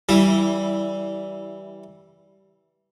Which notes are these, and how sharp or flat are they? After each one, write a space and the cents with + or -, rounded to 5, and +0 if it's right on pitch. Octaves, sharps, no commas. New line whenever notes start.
E3 -15 G3 -20 E4 +0